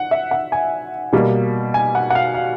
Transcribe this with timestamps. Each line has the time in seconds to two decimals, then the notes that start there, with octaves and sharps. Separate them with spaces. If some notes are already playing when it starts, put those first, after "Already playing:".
Already playing: F#5
0.11 E5
0.31 F#5
0.52 G#5
1.13 B2 G3 A#3
1.74 G#5
1.95 F#5
2.10 F#5
2.15 F5
2.34 F5